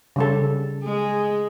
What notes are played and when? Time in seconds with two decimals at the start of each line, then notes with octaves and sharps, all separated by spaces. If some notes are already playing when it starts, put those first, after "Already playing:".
0.16 C#3 G3 A4
0.84 G#3